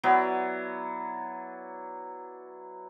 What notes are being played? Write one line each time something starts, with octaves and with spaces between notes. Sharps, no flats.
F#3 B3 E4 D5